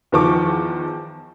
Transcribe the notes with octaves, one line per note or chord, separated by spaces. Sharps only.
E2 D#3 F3 C#6 D6